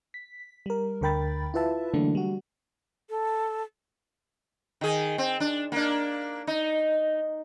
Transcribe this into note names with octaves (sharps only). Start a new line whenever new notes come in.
B6
G3 A#4
D2 D3 A#4 G5 B5 A6
E4 F4 B4 E5 A5
D3 E3 F#3 A3 A#3 D4
G3 F#4
A4
D#3 G#4
C4
D4
A#3 D4
D#4